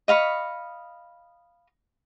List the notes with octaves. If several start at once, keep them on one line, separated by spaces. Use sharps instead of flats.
D#5 F5 B5 C#6